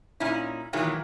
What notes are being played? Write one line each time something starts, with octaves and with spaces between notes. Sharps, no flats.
A#2 C#4 D#4 E4
A#2 D#3 E3 F#3 G#3